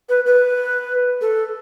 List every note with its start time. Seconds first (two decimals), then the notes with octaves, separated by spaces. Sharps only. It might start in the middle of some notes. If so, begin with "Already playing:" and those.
0.09 B4
0.26 B4
1.21 A4